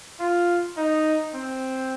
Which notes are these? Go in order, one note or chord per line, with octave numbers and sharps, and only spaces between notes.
F4
D#4
C4